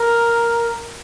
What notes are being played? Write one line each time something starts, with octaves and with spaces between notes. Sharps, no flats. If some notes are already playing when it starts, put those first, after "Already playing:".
Already playing: A#4